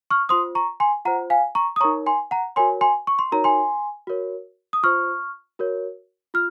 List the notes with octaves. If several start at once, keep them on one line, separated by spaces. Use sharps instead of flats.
C#6 F6
F4 C5 C6 D#6
A#5 C#6
G#5 C6
F4 C5 F#5 A#5
F5 G#5
A#5 C#6
D#6
D#4 A#4 C#5 A#5 C#6
G#5 C6
F#5 A#5
F#4 A#4 C#5 G#5 C6
G#5 C6
C#6
C6
D#4 F#4 A#4 C#5 A#5
G#5 C6
F#4 A#4 C#5
D#6
F4 C5 C#6 F6
F#4 A#4 C#5
F4 F6